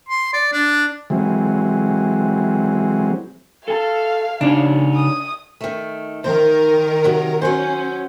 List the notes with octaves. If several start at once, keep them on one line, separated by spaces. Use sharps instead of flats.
C6
D5
D4
E3 F#3 G#3 C4
A4 F5 G#5 A5
C#3 D4 D#4 C#5
D#6
D#3 A3
D#3 A#4 C5
C3 F#3
F#3 C#4 C5